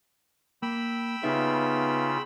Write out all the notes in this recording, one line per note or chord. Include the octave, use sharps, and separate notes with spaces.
A#3 G5 B5 E6
C#3 B3 D#4 F4 G4 E5